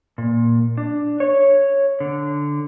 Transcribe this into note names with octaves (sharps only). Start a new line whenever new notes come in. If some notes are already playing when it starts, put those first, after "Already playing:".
A#2
D4
C#5
D3